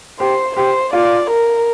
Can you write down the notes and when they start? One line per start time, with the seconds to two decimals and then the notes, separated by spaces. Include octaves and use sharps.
0.19 G4 C5
0.56 G4 C5
0.93 F4 D5
1.31 A#4